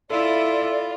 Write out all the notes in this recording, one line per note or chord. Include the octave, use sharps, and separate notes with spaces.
E4 F4 A4 D5